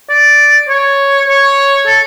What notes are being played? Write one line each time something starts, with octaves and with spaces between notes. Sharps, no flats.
D5
C#5
C#5
A4